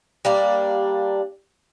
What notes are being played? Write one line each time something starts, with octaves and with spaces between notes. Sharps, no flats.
G3 A#3 D4